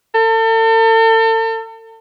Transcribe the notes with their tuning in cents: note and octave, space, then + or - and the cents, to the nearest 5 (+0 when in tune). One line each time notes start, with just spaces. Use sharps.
A4 +40